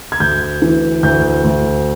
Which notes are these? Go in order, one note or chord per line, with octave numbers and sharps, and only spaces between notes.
G#6
D2 G6
E3
D2 G6
D2